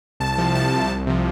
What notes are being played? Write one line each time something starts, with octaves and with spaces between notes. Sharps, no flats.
C2 A5
C3 F3
C2 A5
C3 F3
C2
C3 F3